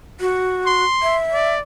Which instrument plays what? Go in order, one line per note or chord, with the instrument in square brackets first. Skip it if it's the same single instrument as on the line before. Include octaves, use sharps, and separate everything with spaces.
[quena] F#4
[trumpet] C6
[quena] E5
[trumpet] D5